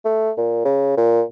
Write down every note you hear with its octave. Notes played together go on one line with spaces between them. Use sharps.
A3
A#2
C#3
A#2